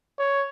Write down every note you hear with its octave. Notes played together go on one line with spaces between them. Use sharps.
C#5